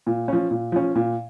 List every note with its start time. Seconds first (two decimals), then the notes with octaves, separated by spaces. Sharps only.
0.07 A#2
0.28 F3 C#4
0.51 A#2
0.72 F3 C#4
0.95 A#2